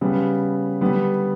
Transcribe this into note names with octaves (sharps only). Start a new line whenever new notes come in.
C#3 G3 B3
D3 G3 B3